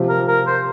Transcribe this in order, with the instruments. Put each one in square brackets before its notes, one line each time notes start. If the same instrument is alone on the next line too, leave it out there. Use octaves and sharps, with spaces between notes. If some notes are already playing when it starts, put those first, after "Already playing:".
Already playing: [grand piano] C3 F3 C4 G4
[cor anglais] A#4
A#4
C5